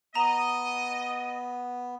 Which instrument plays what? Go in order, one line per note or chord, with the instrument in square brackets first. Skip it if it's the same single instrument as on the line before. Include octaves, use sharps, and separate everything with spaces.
[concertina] B3 [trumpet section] D#5 [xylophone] A#5 E7